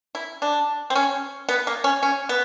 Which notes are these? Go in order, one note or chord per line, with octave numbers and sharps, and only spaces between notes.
E4
D4
C4
C#4
B3
A#3
C#4
C#4
B3